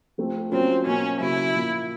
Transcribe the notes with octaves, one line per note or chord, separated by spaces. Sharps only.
F3 A3 C4
F#3 A#3 C4 C#4 F4
B2 F#3 A#3 C#4
C#3 F#3 A#3 E4
A#2 F3 A#3